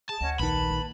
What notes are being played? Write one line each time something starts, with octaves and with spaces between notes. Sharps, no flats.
G#4 A5
D2 C#4 D#5 F#5
A#1 D#3 B4 A5 B5
A#3